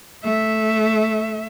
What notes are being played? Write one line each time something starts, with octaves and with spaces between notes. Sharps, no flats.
A3 E5